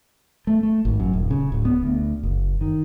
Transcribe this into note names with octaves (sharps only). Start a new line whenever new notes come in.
A3
A3
G#1
F#2
D#1
C#3
D1
B3
D2
F#1
D#3